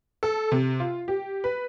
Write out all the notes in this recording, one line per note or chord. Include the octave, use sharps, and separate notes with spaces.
A4
C3
F4
G4
B4